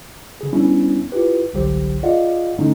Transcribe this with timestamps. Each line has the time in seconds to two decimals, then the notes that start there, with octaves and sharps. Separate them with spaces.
0.41 C#3 G#4
0.53 G3 B3 C#4 D4 E4
1.12 E4 F4 G4 B4
1.54 G1 C2 D3 F#3 G4 C5
2.03 F4 G#4 D5 D#5 F5 F#5
2.59 A2 D3 A3 C#4 D#4